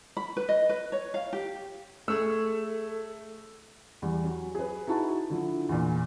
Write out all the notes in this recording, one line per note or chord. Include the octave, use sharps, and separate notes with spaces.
B5
B4
D#5
B4
C#5
F5
G4
A3 G#4 A4 C#5 E6
E2 G3
F#3
G#4 B4
D#4 E4 F#4 A5
D3 F3 E4
E2 A#2